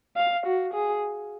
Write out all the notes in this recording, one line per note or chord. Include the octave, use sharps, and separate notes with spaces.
F5
F#4
G#4